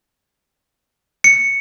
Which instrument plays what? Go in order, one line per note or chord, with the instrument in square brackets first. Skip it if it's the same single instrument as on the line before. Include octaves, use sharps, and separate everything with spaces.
[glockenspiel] C#7